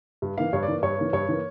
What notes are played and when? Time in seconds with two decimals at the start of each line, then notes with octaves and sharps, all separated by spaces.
0.22 G2
0.38 E3 A#3 F5
0.53 G2 C#5
0.63 D5
0.68 E3 A#3
0.82 G2 C#5
0.98 E3 A#3
1.13 G2 C#5
1.29 E3 A#3